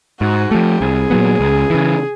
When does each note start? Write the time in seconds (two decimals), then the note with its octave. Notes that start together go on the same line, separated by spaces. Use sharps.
0.21 G#2 F#4
0.51 F3 A3 G4
0.81 C2 G#4
1.10 A#2 F#3 B3
1.40 C#2
1.70 C#3 E3